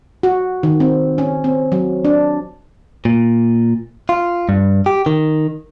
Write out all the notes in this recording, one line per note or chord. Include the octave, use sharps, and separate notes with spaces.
F#4
D#3
C4
C#4
C4
F#3
D4
A#2
F4
G2
G4
D#3